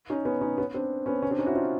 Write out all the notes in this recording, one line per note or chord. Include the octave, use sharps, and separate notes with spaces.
C#4 D#4
B3 C#4
C#4 D#4
B3 C#4
C4 D4
B3 C#4
B3 C#4
C4 D4
C#4 D#4
E4 F#4
D#4 F4